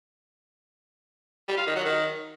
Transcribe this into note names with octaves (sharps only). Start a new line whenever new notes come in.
G3
F4
D#3
F#3
D#3